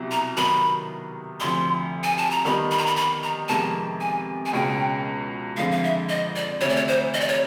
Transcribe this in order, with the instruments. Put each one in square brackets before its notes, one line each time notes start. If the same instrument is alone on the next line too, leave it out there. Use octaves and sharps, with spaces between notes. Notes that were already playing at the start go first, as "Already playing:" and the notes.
Already playing: [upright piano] C2 B2 F#3
[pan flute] A#5
[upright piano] D#3 F#3 B3 [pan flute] B5
[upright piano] D2 C3 F3 [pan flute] C6
[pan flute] G#5
A5
A#5
[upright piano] D#3 G3 B3 D#4 [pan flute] B5
[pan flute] B5
A#5
B5
B5
A#5
[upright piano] F2 C3 D#3 G#3 B3 [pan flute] A5
[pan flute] G#5
G#5
[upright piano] C#2 B2 G#3 C#4 [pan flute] G5
[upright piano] F2 D3 F3 G#3 [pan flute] F5
[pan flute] F5
E5
D#5
D5
[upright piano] D2 C3 E3 A3 [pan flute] C#5
[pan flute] D5
C#5
C5
D#5
D5
C#5